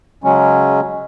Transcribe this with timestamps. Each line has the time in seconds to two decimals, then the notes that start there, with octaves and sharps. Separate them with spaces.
0.24 C#3 F#3 G#3 C#4